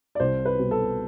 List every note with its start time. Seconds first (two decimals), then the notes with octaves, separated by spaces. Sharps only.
0.15 D5
0.20 C2 C5
0.45 B4
0.59 B2 G3
0.71 A4